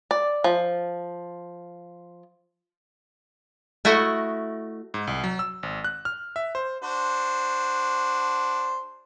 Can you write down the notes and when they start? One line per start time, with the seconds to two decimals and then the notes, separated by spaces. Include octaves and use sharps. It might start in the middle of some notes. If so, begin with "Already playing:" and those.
0.11 D5
0.44 F3
3.85 A3 E4 F#4 D#5
4.94 G#2
5.07 C2
5.24 F#3
5.39 E6
5.63 G#1
5.84 F#6
6.05 F6
6.36 E5
6.55 C5
6.82 D4 F#4 C5